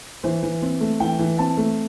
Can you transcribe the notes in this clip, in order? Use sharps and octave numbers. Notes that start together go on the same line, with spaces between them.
E3 C5
E3
C4
A3
E3 G5
E3
C4 A5
A3